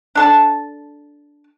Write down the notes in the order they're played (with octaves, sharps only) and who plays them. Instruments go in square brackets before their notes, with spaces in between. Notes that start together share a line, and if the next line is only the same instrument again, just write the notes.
[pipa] D4 A4 A5